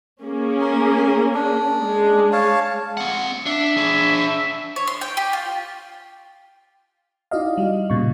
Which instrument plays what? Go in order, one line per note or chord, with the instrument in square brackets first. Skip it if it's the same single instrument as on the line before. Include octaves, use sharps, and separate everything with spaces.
[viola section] A#3 C#4 G#4
[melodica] A#4
D4
[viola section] G#3
[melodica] C#5 F5 A5
[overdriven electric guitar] C4 F#5
[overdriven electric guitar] D4 [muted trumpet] E5
[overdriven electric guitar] D4 G#4
[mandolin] C#5
C6
G5
G4
F4
[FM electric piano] D#4 E4 F#4 D5 D#5 F5
G3
A#2 C#3 C#6